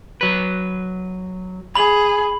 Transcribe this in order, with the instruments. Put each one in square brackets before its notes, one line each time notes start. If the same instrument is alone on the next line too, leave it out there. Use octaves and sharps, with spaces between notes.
[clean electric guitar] F#3 B4
[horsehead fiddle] G#4 [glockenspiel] B5 F#7